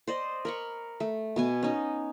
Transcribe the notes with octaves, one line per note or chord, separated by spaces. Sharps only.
C5 D5 D#5
A#4 B5 C#6
A3
B2 B3 G#5
C#4 D#4